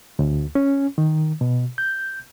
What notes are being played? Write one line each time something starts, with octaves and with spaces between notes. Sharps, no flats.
D2
C#4
D#3
B2
G6